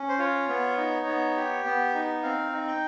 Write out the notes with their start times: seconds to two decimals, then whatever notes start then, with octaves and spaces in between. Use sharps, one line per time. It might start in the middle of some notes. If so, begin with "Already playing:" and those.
Already playing: C#4
0.09 C5
0.19 F4 C#5
0.49 B3
0.77 D#4
1.06 B3
1.36 G4
1.65 B3
1.94 D#4
2.23 C4 F5
2.52 D#4
2.67 G5